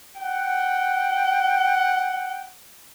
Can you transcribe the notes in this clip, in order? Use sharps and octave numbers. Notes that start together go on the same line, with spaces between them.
F#5 G5